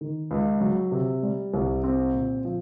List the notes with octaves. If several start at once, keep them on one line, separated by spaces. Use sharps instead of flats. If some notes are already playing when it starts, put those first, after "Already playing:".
D#3
C#2
F#3
C3
G3
C2
C4
A#2
F3